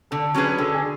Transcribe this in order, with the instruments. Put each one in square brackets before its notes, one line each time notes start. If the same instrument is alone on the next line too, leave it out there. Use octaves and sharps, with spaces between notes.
[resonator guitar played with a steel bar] D3 [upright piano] A4
[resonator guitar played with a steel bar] F#3 C#4 G#4 B4
[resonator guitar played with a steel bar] D3 [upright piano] A4
[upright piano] G#4